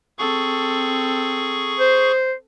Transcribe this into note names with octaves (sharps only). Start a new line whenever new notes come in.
C4 G#4 A4 C#6
C5